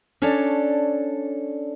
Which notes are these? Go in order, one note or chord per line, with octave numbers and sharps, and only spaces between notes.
C#4 D4 A4 C#5 D5